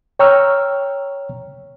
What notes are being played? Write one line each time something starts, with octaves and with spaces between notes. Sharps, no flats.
C#5 G5 A#5 C#6 E6 F6